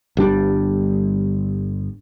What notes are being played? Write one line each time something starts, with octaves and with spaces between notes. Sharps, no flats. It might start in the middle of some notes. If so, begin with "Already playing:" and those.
G1 G3 D4